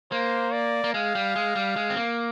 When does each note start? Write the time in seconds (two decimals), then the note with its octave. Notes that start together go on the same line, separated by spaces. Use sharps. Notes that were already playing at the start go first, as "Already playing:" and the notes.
0.12 A#3 C5
0.53 D5
0.84 A#3
0.93 G#3 F5
1.15 G3
1.36 G#3
1.55 G3
1.76 G#3
1.90 C4
1.97 A#3